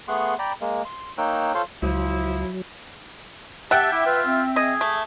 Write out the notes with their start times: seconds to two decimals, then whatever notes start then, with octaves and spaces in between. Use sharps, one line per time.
0.08 A3 B3 G#4 F#5 C6 C#6
0.39 D5 G5 A#5 B5
0.61 G#3 A#3
0.85 C6
1.18 A#3 D#4 C#5 G5 E6 F#6
1.55 F4 A4 C5 C#5 F5 C6
1.83 C#2 F3 F#3 E4
3.71 G4 E5 F#5 G5 A5
3.92 E4 D6
4.06 F4 B4
4.26 C4
4.56 G#4 D#5
4.81 A3